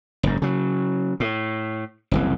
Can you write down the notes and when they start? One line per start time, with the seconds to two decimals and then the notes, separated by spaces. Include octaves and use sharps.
0.23 F#1 G#2
0.42 C#3 F#3
1.20 A2
2.11 F#1 C2 E3